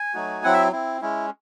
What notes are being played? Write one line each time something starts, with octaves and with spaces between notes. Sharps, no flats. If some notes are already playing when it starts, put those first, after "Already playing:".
Already playing: G#5
F#3 A3 D#4 F#4
F#3 C4 E4 F#5
E5
C4 E4
G#3 C#4 E4